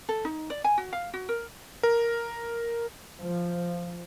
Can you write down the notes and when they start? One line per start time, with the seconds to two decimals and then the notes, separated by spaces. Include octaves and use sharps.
0.09 A4
0.25 D#4
0.50 D5
0.64 G#5
0.78 F#4
0.93 F5
1.14 F#4
1.29 A#4
1.83 A#4
3.21 F3